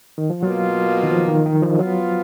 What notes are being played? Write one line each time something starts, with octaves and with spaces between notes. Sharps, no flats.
D#3
F3
B2 F#3 A#3 F4
D#3
F3
D#3
D#3
F3
F3 F#3 B3 F4